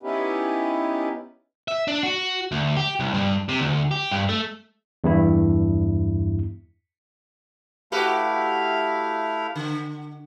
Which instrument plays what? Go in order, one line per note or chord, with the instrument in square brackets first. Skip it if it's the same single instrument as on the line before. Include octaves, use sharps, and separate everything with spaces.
[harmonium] B3 C#4 D#4 E4 G4 B4
[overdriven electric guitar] E5
D4
F#4
D2
G4
C2
G2
C3
D2
G4
G2
A3
[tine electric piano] E2 G2 E4
[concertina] A3 E4 F5 [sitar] F#4 G4 B4
[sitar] D3